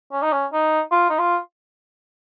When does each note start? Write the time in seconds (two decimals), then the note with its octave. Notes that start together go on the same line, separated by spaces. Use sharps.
0.12 C#4
0.22 D#4
0.32 C#4
0.52 D#4
0.91 F4
1.10 D#4
1.19 F4